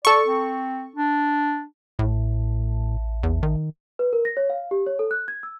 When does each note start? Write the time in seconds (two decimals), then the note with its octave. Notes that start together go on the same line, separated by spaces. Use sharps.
0.05 A4 D5 C#6
0.26 C4
0.96 D4
1.99 A1 A2
3.23 E2
3.43 D#3
3.99 B4
4.13 A#4
4.25 A#6
4.37 C#5
4.50 F5
4.71 G4
4.87 C#5
4.99 A4
5.11 F#6
5.28 G#6
5.43 E6